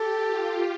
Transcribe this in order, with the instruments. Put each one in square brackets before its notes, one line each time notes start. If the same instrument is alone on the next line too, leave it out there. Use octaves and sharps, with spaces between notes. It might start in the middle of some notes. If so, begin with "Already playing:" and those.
Already playing: [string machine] G4 [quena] A4
[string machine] F4